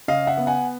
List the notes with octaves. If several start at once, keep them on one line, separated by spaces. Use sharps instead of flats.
C#3 D#5 F5
E5 F#5
B3
F#5 G#5